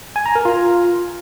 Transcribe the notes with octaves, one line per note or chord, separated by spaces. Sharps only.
G#5
A#5
A#4
F4